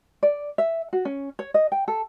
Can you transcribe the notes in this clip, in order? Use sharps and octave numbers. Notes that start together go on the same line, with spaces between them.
D5
E5
F#4
C#4
C#5
D#5
G5
A4